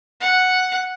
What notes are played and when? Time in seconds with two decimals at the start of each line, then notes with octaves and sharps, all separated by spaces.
0.20 F#5